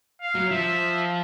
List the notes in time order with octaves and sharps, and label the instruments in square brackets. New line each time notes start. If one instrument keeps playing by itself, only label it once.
[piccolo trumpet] F5
[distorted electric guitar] F#3
[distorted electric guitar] F3 [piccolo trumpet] E5